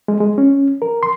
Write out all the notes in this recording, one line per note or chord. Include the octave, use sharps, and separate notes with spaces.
G#3
G#3
C#4
A#4
C6